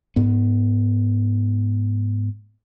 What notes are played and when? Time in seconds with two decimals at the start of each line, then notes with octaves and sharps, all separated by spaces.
0.16 G#2 B3